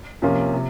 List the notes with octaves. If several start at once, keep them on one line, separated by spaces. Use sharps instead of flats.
C3 F3 A#3 C#4 F4
C3